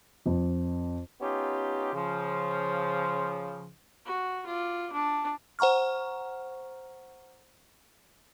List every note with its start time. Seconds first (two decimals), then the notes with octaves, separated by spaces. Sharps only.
0.26 F2
1.20 B3 C#4 D#4 F4 G4
1.93 C#3 F3
4.06 F#4
4.46 F4 D5
4.92 D4 A5
5.59 C5 F#5 A#5 C#6 F6